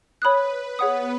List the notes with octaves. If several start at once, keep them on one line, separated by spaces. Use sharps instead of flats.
B4 C#5 B5 D#6 F#6
B3 G#4 C#5 F#5 D#6